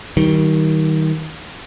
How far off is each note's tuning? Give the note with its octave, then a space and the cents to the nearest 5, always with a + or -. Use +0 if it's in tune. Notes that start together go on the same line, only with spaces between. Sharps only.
D#3 +20 G3 -30